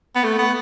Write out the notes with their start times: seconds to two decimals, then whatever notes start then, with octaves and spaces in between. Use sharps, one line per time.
0.16 B3
0.24 A3
0.39 B3